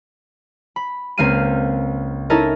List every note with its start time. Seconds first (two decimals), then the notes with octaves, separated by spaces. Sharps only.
0.76 B5
1.18 C#2 A#3 C4 F5 C7 D#7
2.30 C#4 D#4 E4 A4 A#4 D#5